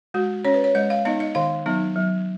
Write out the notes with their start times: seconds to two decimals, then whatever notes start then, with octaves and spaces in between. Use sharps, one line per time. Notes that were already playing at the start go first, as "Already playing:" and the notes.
0.14 G#3 F#4
0.45 C#4 C#5
0.54 B4
0.64 C#5
0.75 G#3 D#5
0.90 F5
1.05 B3 D#4 D#5
1.20 D#5
1.35 D#3 F5
1.66 F#3 B3 D#4
1.96 F#3